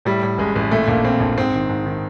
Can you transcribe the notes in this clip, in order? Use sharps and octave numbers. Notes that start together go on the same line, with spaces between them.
A2 G3
A2
A1 G#3
A1
A#2 A3
A#1 A#3
A#2 C4
A#1
G#2 C4
D#3
G#2
D#3